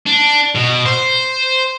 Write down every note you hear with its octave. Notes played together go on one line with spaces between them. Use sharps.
D4
B2
C5